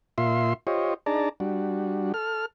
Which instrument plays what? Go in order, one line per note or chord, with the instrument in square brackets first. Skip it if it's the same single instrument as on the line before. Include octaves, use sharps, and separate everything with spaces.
[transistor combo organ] A#2 F4 E5 C6
F4 G4 C5 C#5 D#5
D4 D#4 G#4 D5 A5 A#5
G3 D4 F#4
A4 F6